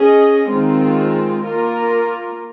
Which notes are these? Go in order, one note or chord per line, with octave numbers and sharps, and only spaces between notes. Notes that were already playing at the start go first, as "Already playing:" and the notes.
Already playing: C#4 G#4 D#5
D#3 G#3 C4 F4
A#3 F4 A#4